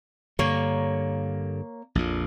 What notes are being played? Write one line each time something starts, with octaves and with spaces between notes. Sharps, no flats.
G2 D3 A#3 C#5
A#1 F2 A#2